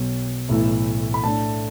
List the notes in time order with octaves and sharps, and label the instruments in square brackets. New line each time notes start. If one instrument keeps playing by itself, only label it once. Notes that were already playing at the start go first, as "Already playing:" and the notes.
Already playing: [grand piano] B1 B2 F#3
B1 A2 E3 A3 E4
B5
A2 A3 D4 A5